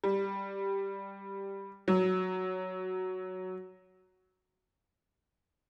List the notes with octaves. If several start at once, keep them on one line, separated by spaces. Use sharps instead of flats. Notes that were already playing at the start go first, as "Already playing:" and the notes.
G3
F#3